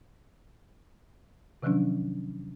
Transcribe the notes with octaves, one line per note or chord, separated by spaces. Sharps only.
C3 D#3 F3 F#3 C#4 D4